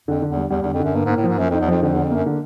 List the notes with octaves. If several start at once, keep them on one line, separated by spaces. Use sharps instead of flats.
F2 D3
D3
E2
G3
E2 G3
E2
D3
F2
F#2 D3
G2 A#3
G#2
A#3
A2
G#2 F3
F#2 F3
F2
D#4
E2
F2 F3
F2 D3
E2
D3
F2
F#2 A#3
D3